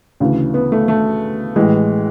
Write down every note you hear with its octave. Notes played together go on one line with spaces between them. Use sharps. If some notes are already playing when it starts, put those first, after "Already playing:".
D2 C#3 E3
B3
A3
A3
A1 A2 E3 G#3